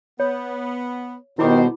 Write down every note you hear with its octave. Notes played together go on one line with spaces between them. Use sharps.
B3 C#5
B2 D#3 G3 E4 C5 B5 D6